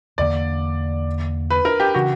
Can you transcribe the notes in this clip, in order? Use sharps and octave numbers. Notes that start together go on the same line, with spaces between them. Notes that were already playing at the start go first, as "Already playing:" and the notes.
E2 D3 A#3 D5
B4
A#4
G4
C#3 E3 F#4